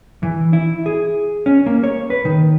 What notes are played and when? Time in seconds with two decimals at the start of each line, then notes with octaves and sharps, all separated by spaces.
0.23 E3
0.53 E4
0.86 G#4
1.46 C#4
1.66 A#3
1.84 C#5
2.10 B4
2.25 D#3